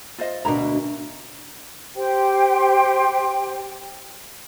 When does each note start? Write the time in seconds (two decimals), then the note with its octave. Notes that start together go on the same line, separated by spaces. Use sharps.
0.18 F4 C5 D#5
0.45 D2 B2 D4 A#4 A#5 B5 F6
1.96 G4 C5 G5